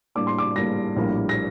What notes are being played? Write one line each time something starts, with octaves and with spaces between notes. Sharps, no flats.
A2 G3 A#3 D4 D6
C6
D6
A2 G3 A#3 D4 A#6
A#1 A2 G3 A#3
A#6